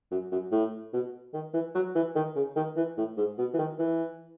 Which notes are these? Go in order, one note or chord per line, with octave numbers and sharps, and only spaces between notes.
F#2
F#2
A2
B2
D#3
E3
F#3
E3
D#3
C#3
D#3
E3
A2
G#2
B2
E3
D#3
E3